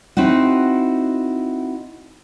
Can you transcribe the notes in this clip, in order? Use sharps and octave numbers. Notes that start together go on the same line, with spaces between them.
C4 D#4 E4 F#4